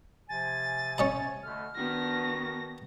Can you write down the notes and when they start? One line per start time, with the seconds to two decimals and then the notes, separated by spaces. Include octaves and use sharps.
0.29 C3 F3 G#5 A6
0.98 C#4 D#5 A#5
1.43 B2 D3 A3 F6
1.76 D#3 B3 D4 F#4 A#6